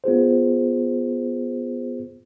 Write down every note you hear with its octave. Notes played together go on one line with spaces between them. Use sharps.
B3 F4 G#4 C5